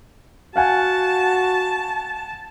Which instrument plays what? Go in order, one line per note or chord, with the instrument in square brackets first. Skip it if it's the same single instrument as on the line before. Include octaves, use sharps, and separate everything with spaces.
[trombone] F#4 [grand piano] F5 F#5 G#5 [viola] A5